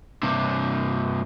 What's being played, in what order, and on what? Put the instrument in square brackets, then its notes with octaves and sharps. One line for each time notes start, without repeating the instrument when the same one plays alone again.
[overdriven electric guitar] G2 C3